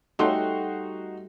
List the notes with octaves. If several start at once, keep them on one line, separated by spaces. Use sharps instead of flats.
G3 A3 D#4 F#4 C6